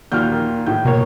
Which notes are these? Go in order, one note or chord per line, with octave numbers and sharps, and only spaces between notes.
D#2 A#2 F#4 F6 G6
D#3
A2 G6
B2 A#3 C#5